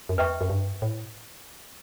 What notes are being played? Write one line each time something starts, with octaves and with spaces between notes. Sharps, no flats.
F#2
E2 B4 E5 G5 C#6
F#2
G2
A2